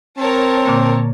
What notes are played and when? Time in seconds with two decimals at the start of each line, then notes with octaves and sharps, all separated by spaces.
0.18 C4 A#4 C#5 A5
0.65 A#2 D3 A#3